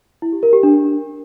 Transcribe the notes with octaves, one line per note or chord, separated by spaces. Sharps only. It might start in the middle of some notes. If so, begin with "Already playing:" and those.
E4
G4
A#4
G4
D4